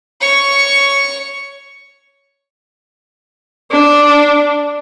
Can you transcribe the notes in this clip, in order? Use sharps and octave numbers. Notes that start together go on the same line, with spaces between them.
C#5 C#6
D4